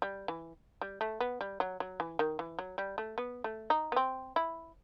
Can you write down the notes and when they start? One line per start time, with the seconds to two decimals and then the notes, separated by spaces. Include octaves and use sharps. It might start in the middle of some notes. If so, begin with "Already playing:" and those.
0.02 G3
0.28 E3
0.81 G3
1.01 A3
1.20 B3
1.41 G3
1.60 F#3
1.80 F#3
2.00 E3
2.19 D#3
2.39 E3
2.59 F#3
2.78 G3
2.98 A3
3.18 B3
3.44 A3
3.70 D#4
3.92 B3
3.96 C4
4.36 E4